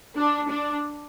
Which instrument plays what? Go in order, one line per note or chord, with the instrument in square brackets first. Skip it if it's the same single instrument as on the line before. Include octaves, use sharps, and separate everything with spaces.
[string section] D4
D4